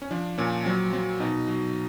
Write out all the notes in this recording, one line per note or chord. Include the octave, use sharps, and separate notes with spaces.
C#4
F3 D4
A#2 C#4
F#3 C4
F#3 C4
B2 D#4
F#3